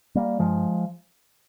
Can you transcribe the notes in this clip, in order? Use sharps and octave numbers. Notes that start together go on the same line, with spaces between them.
G3 A#3
G2 F3 G#3